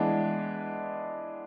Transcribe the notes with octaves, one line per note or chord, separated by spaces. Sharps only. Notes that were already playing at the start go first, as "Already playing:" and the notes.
Already playing: E3 G#3 B3 D4